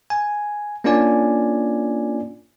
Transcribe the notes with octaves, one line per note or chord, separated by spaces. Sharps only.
G#5
A#3 C#4 D4 F4 D5 G#5